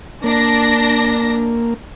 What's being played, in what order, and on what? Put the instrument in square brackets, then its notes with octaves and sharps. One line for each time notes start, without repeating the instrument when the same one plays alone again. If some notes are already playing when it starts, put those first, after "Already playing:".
[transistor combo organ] A#3 [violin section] D4 A#6